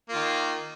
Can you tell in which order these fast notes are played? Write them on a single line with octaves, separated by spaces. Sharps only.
A#3 F4 D#3